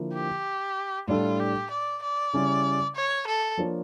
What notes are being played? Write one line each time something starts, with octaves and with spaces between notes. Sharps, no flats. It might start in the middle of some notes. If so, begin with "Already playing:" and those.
Already playing: D3 F3 A#3 E4
G4
A2 G3 D4 F4 A4
G4
D5
D5
C#3 G3 C#4 E4
C#5
A4
F3 A#3 D4 F4 C#5